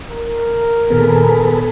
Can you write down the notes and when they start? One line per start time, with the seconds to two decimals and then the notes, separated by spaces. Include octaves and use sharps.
0.10 A#4
0.90 A#2 D#3 B3 G#4 A4 B4